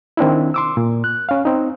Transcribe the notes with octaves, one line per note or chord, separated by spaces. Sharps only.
D#3 C4 D4 E4
C6 D6 E6
A#2
F#6
C#4 F5
C4 D#4